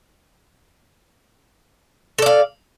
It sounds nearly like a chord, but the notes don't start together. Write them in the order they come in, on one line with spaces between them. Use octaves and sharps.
A4 D5 F5